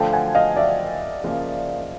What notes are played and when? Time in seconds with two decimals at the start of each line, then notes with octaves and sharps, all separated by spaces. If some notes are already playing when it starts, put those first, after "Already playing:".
Already playing: D3 F3 A3 G5 A5
0.13 F#5 G#5
0.35 D#5 F5
0.56 D5 E5
1.24 C#3 F3 A#3